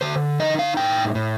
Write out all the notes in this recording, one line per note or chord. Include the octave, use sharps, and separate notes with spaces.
D3 C5
D#4 D#5
F5
A2 G5
A2